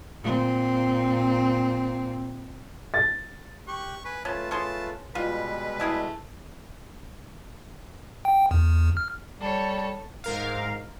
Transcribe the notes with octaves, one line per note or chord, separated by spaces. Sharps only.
A#2 C4
A6
G4 C#6 F#6
B4 G#5
A3 C#4 F4 B4 A5
C#4 G#4 A5 C6
B2 G3 G#3 F4 B4
A3 E4 G#4
G5
E2
F6
G3 A4 C#5
G#2 A#4 F5